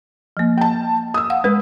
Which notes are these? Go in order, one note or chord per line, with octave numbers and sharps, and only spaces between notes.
F3 A#3
G5 A5
D#6 E6
F5 F#5
G#3 B4